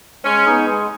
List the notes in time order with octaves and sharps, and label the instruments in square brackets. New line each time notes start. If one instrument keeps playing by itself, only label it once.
[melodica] G#3 [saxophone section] C#4
[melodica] B3 D#4 G#4
G#3